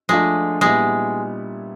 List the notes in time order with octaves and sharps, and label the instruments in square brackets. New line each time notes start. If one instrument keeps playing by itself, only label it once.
[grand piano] F3 A3 D4 F4 [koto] G#3
[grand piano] A#2 G3 B3 E4 [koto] G#3